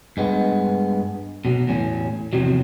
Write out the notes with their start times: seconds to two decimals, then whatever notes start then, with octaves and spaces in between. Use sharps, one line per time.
0.17 G2 G#3 B3
1.45 B2 F#3
1.67 E2 A2 C#4
2.33 E2 G#2 C3 F3 F#3